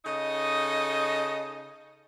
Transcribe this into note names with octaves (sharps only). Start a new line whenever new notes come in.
C#3 D#4 A4 D#5